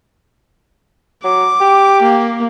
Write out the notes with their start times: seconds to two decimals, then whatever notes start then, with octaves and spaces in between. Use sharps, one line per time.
1.24 F#3 D6
1.61 G4
2.02 A#3